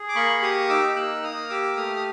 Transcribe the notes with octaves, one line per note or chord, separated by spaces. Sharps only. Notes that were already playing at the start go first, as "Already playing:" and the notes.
Already playing: G#4
D6
A#3 B5 C#6
G4 C#6 D#6
D#4 D6 E6
A#3 E6 F#6
A#3 D#6 F6
G4 D6 E6
A3 D#6 F6
D#6